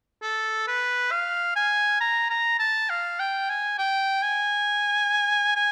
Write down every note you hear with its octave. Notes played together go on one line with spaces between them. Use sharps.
A4
B4
F5
G#5
A#5
A#5
A5
F5
G5
G#5
G5
G#5
G#5